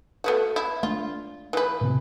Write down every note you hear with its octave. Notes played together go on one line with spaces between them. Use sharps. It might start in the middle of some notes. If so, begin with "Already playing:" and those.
A3 B3 F#4
E4
A3 D4 F4
E3 B4
A2 C3